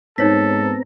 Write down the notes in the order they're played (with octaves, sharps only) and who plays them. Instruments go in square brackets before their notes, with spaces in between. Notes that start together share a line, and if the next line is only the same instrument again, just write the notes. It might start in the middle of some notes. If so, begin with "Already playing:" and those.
[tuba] G#2 [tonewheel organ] B3 C4 A#5 [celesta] D#4 C#5 B6 [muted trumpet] A4